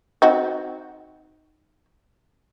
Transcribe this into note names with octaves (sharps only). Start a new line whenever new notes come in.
C4 D#4 F#4